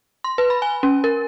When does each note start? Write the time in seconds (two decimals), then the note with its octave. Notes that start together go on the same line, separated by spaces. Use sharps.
0.24 C6
0.38 B4
0.50 B5
0.62 G#5
0.83 C#4
1.04 A#4